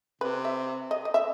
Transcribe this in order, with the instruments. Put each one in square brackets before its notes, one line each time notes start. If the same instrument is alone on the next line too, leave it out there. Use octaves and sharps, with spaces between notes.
[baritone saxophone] C3 [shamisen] B4
[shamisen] E5
D#5
D#5
E5